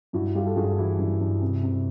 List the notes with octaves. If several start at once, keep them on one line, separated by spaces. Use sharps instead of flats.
G2 E4 F#4
G3 F4 G4
A4
G2 F#4 G#4
E3 E4 F#4
G2
G2
C3
C3